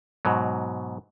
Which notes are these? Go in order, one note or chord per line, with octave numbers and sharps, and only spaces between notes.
G#2 B2 F#3